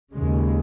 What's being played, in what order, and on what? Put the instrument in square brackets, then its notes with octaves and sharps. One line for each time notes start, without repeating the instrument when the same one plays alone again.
[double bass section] D#2 C#3 G#3